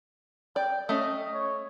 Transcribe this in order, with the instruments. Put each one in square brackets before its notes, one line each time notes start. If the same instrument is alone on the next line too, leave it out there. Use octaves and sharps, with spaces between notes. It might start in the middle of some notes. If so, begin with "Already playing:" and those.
[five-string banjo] D5 [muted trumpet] G5
[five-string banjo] A3 C#4 [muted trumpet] D#5
[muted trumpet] C#5